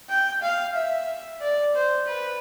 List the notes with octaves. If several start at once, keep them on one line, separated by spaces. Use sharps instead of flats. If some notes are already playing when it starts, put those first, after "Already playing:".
G5
F5
E5
D5
C5
B4